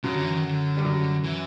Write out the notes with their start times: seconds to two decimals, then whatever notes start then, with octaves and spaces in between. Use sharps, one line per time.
0.03 F#2 C#3 F#3
0.14 D3
0.24 E3
0.34 D#3
0.43 D3
0.77 G3
0.84 F#2 F#3
1.24 E3